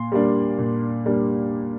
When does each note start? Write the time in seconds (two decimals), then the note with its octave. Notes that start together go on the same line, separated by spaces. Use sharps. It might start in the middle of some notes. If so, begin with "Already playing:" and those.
Already playing: A#2 C6
0.12 G3 A#3 D4
0.58 A#2
1.06 G3 A#3 D4